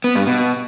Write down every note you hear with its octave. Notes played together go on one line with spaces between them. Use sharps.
B3
G2
B2